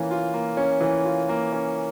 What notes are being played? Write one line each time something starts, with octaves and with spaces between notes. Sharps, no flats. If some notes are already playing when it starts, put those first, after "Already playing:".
Already playing: E3 A#3 C#4 F4
F4
A#3
C#4
E3
F4
A#3
C#4